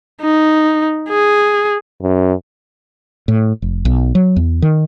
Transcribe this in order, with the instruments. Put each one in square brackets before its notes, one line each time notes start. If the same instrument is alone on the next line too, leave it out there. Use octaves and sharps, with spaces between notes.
[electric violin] D#4
G#4
[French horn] F#2
[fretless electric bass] A2
F1
B1
F#3
E2
D#3